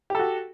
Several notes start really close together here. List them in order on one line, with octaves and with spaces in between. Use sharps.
G4 A4 F#4